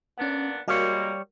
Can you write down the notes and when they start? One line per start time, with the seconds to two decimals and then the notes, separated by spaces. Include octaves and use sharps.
0.18 A#2 B3 C#4 D4 F#5
0.68 G3 G#3 A#3 F#4 A#4 C#5